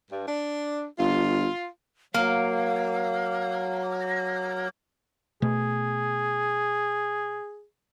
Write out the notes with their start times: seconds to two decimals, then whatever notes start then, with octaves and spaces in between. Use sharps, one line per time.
0.11 G2
0.28 D4
0.98 G1 F4
2.14 F#3 A#3 F5
5.42 B2 A3 G#4